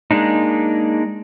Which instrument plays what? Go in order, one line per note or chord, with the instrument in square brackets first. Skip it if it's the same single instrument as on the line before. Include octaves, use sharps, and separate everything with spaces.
[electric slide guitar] G#3 A#3 D4 D#4